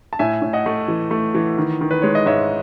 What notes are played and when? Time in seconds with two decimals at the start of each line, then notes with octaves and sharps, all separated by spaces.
0.13 A5
0.19 A2 E5 G#5
0.42 A2
0.53 D#5 F#5
0.66 A3
0.88 E3
1.11 A3
1.35 E3
1.58 D#3
1.81 D#3
1.91 B4
2.02 G#3 C#5
2.15 D#5
2.26 G#2 C#5 E5